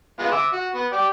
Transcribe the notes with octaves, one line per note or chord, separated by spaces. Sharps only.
G#3 B3 F4
E5 D6 E6
F#4
B3
G4 D5